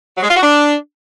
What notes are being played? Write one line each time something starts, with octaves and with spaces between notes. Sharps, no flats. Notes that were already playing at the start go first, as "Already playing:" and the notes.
F#3
G#3
F4
F#4
D4